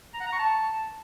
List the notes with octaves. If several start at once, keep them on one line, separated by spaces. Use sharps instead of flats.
A#5
F#5
A#5
C#6
A5